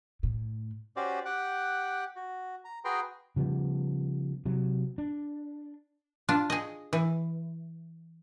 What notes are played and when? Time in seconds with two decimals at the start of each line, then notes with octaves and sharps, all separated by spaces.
0.23 A2
0.96 C#4 F#4 G4 C5 D5
1.25 G4 F#5 G5 F#6
2.16 F#4
2.65 A#5
2.85 F#4 G#4 B4 G5 A#5 C6
3.36 C#3 F3 G3 B3
4.46 C3 F#3
4.98 D4
6.29 D4 F4
6.50 G#4 D#5
6.93 E3